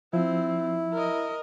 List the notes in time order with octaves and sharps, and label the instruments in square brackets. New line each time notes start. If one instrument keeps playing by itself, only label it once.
[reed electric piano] F3 [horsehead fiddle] C4 [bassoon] E4
[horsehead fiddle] A#4 D#5